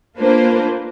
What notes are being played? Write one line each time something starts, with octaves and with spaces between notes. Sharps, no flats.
A#3 D4 F4 B4 C5